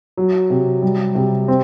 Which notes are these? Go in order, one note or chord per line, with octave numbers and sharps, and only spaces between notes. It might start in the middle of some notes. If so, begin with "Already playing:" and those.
F#3
C3
G3
C3
C4